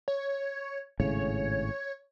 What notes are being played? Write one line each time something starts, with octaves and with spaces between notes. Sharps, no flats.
C#5
G#1 A2 C#3 C#5